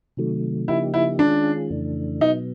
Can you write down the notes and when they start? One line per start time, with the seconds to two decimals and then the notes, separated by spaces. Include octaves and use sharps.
0.17 C3 D#3 F#3 A3
0.68 C#3 F3 A#3 D#4 E4 G4
0.94 E4
1.19 D#3 G#3 C#4 D4 F4 G#4
1.70 F2 C#3 E3 A3 D4
2.21 B2 F#3 B3 D#4